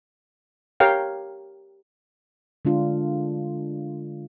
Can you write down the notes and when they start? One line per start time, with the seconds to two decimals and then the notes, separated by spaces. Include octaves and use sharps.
0.80 G4 A#4 C#5 F5 G5
2.65 D3 G#3 D4 F4